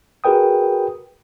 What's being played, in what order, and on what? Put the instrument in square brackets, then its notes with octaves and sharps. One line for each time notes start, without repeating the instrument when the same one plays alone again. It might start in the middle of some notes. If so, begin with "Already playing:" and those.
[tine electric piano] F#4 G#4 A#4 B4 G5 D#6